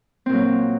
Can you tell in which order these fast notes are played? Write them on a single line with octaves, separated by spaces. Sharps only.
C4 A#2 F#3